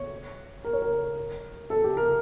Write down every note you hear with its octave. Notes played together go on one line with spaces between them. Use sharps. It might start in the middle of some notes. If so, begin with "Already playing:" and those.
Already playing: C#5
A#4
C#5
A#4
A4
G4
A#4